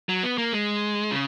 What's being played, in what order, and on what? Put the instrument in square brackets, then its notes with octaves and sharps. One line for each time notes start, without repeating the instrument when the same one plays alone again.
[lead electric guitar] F#3
B3
A#3
G#3
C#3